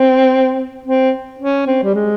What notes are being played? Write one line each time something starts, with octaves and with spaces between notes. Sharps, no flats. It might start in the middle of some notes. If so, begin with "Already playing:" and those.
Already playing: C4
C4
C#4
C4
G3
G#3